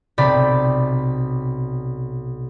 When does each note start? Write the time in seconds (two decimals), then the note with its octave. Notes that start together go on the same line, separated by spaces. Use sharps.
0.18 B1 C3 D5 G5 B5